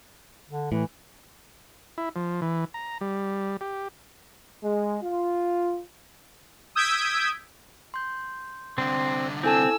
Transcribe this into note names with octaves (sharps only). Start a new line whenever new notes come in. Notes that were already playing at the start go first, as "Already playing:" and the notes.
D3
A2 E3
E4
F3
E3
A#5
G3
G4
G#3
F4
D#6 E6 G6 G#6 B6 D7
C6 G6
C2 D3 C4
C4 E4 A4 G#5 A5 E6